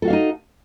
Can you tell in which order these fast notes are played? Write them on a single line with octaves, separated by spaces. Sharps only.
A4 F#4 F5 D4 D#4